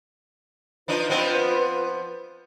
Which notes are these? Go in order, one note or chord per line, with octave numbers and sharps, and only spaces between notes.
F3 D4 D#4 F4 B4
F3 B3 C4